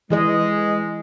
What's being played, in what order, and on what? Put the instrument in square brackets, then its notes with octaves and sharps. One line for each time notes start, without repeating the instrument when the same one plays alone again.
[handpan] E3 G#4 D#5 [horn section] G#3